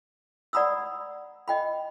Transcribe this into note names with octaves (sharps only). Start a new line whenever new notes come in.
D5 F#5 A#5 B5 D#6 E6
D#5 G5 B5